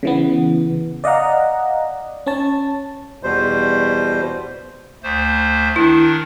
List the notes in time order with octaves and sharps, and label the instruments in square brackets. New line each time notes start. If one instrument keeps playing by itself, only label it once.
[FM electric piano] C#3 E3 B3
D5 D#5 F5 F#5 A#5
C#4 C#5 A5
[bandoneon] E2 B2 G3 C5
[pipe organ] D2 A3 C5
[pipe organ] D#3 D4 [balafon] E4